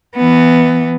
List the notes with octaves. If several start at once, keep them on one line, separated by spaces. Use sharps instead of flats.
E3 B3